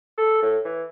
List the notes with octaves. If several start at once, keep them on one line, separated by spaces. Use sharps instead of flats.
A4
A2
E3